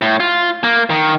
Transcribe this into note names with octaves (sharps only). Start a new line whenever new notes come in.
A2
F4
A#3
D#3